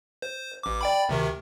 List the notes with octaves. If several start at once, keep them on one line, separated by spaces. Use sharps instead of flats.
C5
A1 D6
D5 G5 B5
D2 C3 D#3